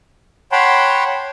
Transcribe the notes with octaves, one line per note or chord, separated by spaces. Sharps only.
C#5 F#5 G5 A5 B5 C6